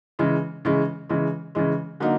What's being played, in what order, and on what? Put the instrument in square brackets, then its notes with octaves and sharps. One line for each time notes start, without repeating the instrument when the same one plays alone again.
[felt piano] C#3 E3 G#3
C#3 E3 G#3
C#3 E3 G#3
C#3 E3 G#3
D3 F#3 A#3 D#4